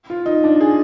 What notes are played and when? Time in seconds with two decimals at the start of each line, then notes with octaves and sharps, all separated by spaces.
0.10 F4
0.26 D#4
0.44 D4
0.61 G#4